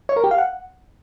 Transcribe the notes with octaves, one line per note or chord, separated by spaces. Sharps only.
C#5
A#4
G4
F5
F#5